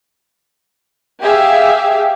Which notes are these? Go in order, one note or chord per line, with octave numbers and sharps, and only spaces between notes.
G4 G#4 E5 F5